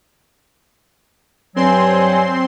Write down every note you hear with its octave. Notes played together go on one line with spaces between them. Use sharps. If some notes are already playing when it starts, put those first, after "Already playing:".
G2 F#3 C4 G#5 C6